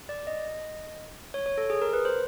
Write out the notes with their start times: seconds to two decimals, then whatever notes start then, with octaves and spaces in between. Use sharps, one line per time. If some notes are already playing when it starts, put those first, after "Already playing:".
0.09 D5
0.27 D#5
1.34 C#5
1.46 C#5
1.58 A4
1.70 G#4
1.82 A#4
1.93 B4
2.05 C5